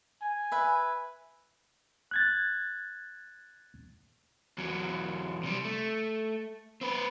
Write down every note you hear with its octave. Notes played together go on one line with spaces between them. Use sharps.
G#5
B4 E5
F#6 G#6 A6
E2 F#3
C3 G3
A3
C4 B4